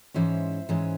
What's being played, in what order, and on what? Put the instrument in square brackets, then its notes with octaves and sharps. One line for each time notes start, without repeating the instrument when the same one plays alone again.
[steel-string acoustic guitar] G#2 E3 G#3 C#4 C5 E5
G#2 E3 G#3 C#4